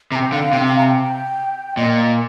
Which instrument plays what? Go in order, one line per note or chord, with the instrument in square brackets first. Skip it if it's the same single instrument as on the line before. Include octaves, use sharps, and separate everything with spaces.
[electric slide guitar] C3 [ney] A#5
[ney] G5
[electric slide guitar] D3 [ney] F5
[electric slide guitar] C3 [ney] G5
[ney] F5
A#5
G5
[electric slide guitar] A#2 [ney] D#5